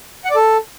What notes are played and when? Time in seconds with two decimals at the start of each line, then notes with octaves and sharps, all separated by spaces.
0.25 F#5
0.30 D5
0.36 A4